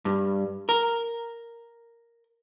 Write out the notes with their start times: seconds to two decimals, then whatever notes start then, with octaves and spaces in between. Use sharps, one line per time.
0.05 G2
0.69 A#4